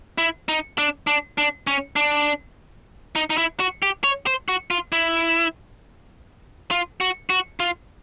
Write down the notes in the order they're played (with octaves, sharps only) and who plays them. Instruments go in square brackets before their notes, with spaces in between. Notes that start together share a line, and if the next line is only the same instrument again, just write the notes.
[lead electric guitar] E4
D#4
D4
D4
D4
C#4
D4
D#4
D#4
E4
F#4
G4
C#5
C5
F#4
F4
E4
F4
F#4
F#4
F4